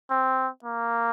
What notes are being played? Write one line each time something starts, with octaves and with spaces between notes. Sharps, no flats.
C4
A#3